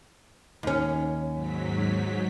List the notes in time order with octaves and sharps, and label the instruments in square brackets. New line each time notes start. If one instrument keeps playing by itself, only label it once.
[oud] D#2 C#4
[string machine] G#2 F#3 B6